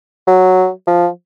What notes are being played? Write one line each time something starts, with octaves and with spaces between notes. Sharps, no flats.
F#3
F3